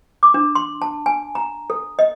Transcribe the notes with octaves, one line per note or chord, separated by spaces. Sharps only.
D6
D4
C6
A5
G#5
A#5
A4
D#5